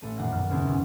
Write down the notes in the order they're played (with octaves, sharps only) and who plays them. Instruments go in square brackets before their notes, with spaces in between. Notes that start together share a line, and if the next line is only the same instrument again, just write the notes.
[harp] A1 A3 D#7
F1 A#2 D#3 F#5 F#6 A#6
B1 F#2 F6 A#6
E2 C#3 E3 A#3 C4 C#4
F#1 B1 G#2 B2